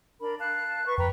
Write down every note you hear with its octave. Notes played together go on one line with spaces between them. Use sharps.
D4 A#4 B5
F5 A5 F#6
B4 C#6
F2 B4 G5 A#5